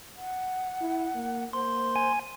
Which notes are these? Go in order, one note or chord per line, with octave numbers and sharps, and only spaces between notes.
F#5
E4
A#3
A#3 C5 C6
G#5